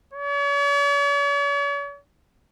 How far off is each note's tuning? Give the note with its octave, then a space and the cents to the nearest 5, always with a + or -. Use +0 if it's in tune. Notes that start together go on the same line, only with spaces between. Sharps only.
C#5 +45